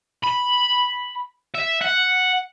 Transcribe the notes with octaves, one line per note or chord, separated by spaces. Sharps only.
B5
E5
F#5